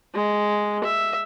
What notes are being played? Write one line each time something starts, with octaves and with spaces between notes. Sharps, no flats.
G#3
E5